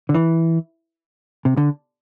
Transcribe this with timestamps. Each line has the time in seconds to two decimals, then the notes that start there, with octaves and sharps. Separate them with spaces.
0.09 D3
0.14 E3
1.45 C3
1.57 D3